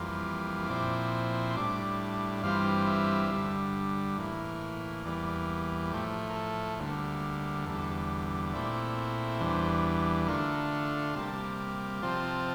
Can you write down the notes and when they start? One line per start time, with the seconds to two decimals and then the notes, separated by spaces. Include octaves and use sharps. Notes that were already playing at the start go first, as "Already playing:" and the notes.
Already playing: F2 E3 G3 A#3 F4
0.68 A#2 F3 C4 E4 D6
1.51 C6
1.56 A2 G3 D4 D6
2.43 G2 E3 G3 C4 F4 F5
2.87 E5
3.30 G2 D3 G3
4.18 A2 E3 A#3
5.05 E2 E3 G3 A#3 D5
5.91 A2 F3 A3 G4
6.30 A#4
6.36 A4
6.79 D2 D3 G3 A#3
7.66 E2 D3 G3 A4
8.53 A#2 A3 C4 E4 D5
9.41 E2 E3 G3 D4 C5
10.28 D3 A3 D4 F4 A#4
11.15 C3 G3 A#3 A5
12.02 C3 F3 C4 F4 A5